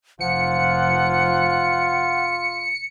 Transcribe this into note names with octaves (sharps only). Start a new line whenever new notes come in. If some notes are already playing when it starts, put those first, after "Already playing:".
F1 F3 F4 F#5 C#7